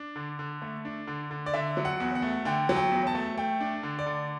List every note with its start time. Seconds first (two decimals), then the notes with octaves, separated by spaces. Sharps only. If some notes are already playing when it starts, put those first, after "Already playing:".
Already playing: D4
0.16 D3
0.39 D3
0.62 A3
0.85 D4
1.07 D3
1.31 D3
1.46 D5
1.54 D3 E5
1.77 F#3
1.85 F#5
2.00 E2
2.15 F#5
2.22 A3
2.45 D3 G5
2.69 F#3
2.76 G5
2.91 E2
3.07 A5
3.15 A3
3.37 A3 G5
3.60 D4
3.83 D3
3.99 D5
4.06 D3